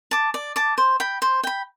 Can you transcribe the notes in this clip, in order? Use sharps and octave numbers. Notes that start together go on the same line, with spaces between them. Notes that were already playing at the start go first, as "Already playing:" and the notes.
A5 D6
D5
A5 D6
C5
G5 B5
C5
G5 B5